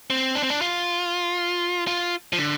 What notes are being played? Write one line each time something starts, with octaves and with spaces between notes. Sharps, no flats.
C4
D4
C4
D4
F4
F4
F3
D3